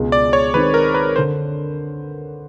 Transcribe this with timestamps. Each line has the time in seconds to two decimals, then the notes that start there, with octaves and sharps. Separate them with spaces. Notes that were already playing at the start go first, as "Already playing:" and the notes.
Already playing: C#2 B2 G#3
0.12 D5
0.33 C#5
0.54 D#3 G#3 C4 B4
0.74 A#4
0.94 B4
1.16 D3 C5